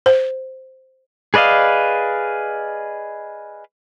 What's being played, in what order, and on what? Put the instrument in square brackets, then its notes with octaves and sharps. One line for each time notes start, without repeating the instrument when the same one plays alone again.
[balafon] C5
[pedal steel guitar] G#4 B4 D5 D#5 F5